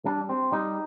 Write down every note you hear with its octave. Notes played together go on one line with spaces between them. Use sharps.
G3 D4
C4
G3 D#4